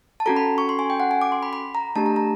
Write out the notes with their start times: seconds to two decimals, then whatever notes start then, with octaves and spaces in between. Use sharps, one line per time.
0.20 A5
0.26 C#4 F#4 A4 A#5
0.37 B5
0.58 C#6
0.69 C6
0.79 G#5
0.90 G5
1.00 F#5
1.11 G#5
1.22 D6
1.32 C6
1.43 B5
1.53 B5
1.75 A#5
1.96 A3 D4 G4 A5
2.06 A#5
2.16 A#5